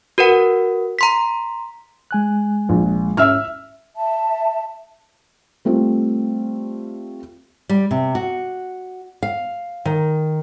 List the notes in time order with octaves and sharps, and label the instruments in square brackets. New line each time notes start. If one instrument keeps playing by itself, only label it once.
[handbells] F#4 A#4 B4 F#5
A#5 C6 B6
[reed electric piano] G#3 G#5 F#6
[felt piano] A#1
[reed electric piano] G#2 C#4 [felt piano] E5 E6 F6
[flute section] E5 A5
[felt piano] G3 A3 C4 F4
[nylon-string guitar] G3
C3
F#4
F5
D#3